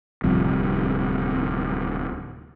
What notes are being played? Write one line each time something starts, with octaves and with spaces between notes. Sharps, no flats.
D1 C2 C3 F3